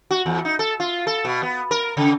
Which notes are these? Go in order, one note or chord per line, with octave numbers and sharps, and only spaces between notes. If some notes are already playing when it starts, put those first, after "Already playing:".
F#4
E2
D#4
A4
F4
A4
B2
B3
A#4
C#3